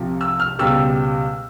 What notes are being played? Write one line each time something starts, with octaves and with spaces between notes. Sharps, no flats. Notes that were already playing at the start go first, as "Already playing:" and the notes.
Already playing: C2 C3 F3
E6
F6
C#2 B2 G3 E6